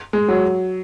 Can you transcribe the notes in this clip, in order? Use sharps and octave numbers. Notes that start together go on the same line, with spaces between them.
G#3
F#3